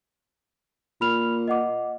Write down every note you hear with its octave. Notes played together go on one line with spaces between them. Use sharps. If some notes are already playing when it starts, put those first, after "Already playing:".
A#2 B5 F6 F7
D#5 F#5 D6